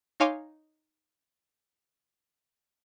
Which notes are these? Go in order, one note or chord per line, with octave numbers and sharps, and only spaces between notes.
D#4 C#5 F5 G#5 C6 D6